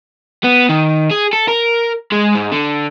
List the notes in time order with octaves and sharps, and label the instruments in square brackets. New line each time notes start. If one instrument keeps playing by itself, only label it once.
[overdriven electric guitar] B3
D#3
G#4
A4
A#4
G#3
G#2
D3